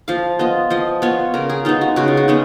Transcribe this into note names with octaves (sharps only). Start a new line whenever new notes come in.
F3 F5
B3 F4 D#5
F3 D#5
B3 F4 C#5
C#3 A#4
G#4
G#3 B3 D#4 F4
F#4
C#3 F#4
F4
F#4
G#3 B3 D#4